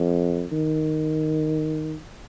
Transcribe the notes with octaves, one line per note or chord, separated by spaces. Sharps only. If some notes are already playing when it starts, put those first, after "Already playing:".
Already playing: F2
D#3